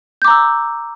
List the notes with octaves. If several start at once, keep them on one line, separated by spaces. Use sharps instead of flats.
A#5 D6 E6 G6